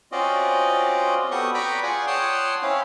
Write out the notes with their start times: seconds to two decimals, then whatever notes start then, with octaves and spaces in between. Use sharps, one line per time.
0.12 C4 C#4 F4 F#4 D5 D#5
1.31 B3 F#4 G4 A4 C#6 D#6
1.54 B4 D5 G5 A#5 B5 C#6
1.83 F4 G#4 D5 F#5 G#5
2.07 C#5 F#5 G5 A5 C6 D#6
2.62 C4 C#4 E4 C#5 F5